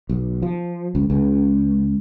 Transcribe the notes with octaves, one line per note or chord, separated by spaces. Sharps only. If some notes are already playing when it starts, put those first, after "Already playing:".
B1
F3
C#2
C#2